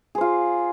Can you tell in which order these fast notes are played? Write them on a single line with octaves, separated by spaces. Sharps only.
G#4 C5 F4